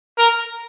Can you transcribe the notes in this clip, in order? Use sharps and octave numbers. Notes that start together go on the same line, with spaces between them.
A#4